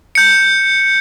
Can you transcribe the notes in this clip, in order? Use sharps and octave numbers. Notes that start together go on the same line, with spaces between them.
G6 C#7